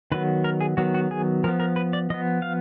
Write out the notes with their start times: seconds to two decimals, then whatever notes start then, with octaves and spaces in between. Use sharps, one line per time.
0.12 D#3 F#3 B3 B4
0.44 A#4
0.61 G#4
0.77 D#3 F#3 B3 F#4
0.94 F#4
1.11 G#4
1.44 F3 B3 A#4
1.60 A#4
1.76 B4
1.93 D5
2.10 F3 B3 D#5
2.42 F5